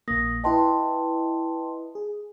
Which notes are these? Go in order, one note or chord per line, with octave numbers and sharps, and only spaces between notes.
A#1 A#3 D#6 A#6
E4 B4 D#5 G5 A5 C6
G#4